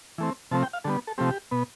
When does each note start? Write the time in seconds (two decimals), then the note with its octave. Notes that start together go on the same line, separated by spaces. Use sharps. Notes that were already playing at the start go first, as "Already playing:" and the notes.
0.18 E3 A3 C4
0.51 C3 F3 A3 C4 A5
0.63 G5
0.73 F5
0.84 D3 G3 B3 A4
1.07 A4
1.18 C3 F3 A3 C4 G4
1.51 B2 B3